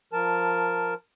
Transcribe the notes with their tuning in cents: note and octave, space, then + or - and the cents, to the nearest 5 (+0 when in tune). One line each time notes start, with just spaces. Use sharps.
F3 +0 A#4 +0 A5 +0